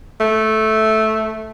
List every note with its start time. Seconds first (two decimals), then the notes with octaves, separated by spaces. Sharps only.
0.20 A3